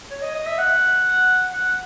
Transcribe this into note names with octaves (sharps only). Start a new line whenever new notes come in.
C#5
D#5
D#5
E5
F#5
F#5